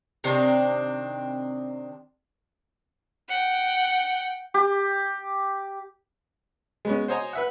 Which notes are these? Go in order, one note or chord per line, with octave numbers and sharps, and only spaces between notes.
C3 D#3 C4 D4
F#5 G5
G4
G#3 B3 C#4
C5 C#5 D#5 G#5 A#5
B4 E5 F#5